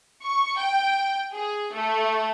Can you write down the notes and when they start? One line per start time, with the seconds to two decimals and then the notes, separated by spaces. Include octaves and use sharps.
0.23 C#6
0.57 G5
1.33 G#4
1.73 A3